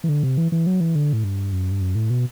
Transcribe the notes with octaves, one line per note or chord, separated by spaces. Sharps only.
E3
D3
C3
E3
E3
F#3
E3
D3
A2
G2
F#2
G2
F#2
A2
B2